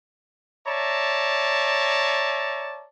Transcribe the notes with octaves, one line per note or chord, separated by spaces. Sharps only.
C#5 D5 E5 A5 A#5